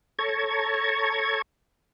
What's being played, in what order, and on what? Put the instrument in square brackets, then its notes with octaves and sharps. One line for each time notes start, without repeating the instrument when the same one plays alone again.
[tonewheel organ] A4 C#5 A5 A#5 C#6 G#6